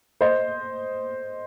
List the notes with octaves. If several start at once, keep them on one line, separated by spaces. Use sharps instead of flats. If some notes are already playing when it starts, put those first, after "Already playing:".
C5 D#5